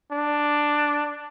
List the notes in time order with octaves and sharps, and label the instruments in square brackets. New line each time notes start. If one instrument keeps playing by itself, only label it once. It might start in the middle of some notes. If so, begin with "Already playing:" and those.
[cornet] D4